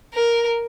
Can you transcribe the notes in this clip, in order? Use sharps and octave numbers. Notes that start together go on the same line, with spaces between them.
A#4